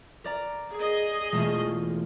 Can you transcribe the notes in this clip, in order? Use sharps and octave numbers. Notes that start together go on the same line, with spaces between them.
A#4 D5 A#5
G#4 D#5
E1 A3 F4